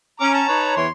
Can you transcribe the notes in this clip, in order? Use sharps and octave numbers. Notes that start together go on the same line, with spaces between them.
C#4 A#5 D6
A5 A#5
D#4 B4 C#5
E2 E3 C#5 C6